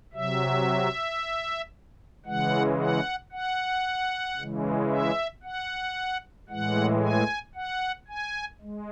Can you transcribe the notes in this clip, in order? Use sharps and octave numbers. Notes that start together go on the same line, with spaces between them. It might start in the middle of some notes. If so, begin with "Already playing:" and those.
C3 F#3 E5
C#3 E3 G#3 F#5
F#5
F#5
C#3 E3 G#3
E5
F#5
A2 E3 G#3 F#5
G#5
F#5
G#5
G#3